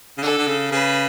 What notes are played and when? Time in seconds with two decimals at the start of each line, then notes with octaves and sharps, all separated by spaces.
0.17 C#3
0.22 D3 A4
0.38 D3
0.47 C#3
0.72 C#3 B4